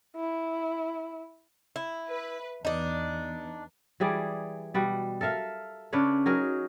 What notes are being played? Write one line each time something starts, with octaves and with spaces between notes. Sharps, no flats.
E4
E4
B4
E2 D4 D#4
E3 G3 G#4 D5
B2 G3 F#5
A4 A#4 E5 F5
C#3 D4 B4 C#5
F#3 D#4 G#4 A#4